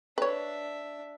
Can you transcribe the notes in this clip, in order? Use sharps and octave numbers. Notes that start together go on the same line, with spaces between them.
D4 B4 C#5 E5